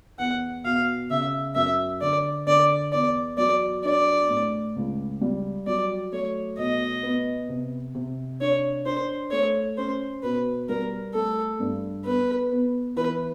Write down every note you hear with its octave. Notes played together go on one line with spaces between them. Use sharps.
E2 F#5
B2 F5
C#3 E5
F#2 E5
D3 D5
D3 D5
E2 D5
F#3 D5
D4 D5
A2
C#2
G3
F#3 D5
A3 C#5
B2 D#5
B3
C3
C3
D4 C#5
D4 C5
A3 C#5
C#4 C5
B2 B4
G3 A#4
A3 A4
G2
B3 B4
B3
E3 B4